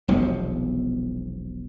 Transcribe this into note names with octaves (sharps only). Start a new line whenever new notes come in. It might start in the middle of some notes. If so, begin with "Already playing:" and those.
E1 B1 C3 F3